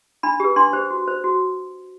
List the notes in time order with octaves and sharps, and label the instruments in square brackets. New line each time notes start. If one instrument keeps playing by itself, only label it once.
[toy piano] D4 B5
G4 B4
D4 C6
G4 C5
F#4
C5
F#4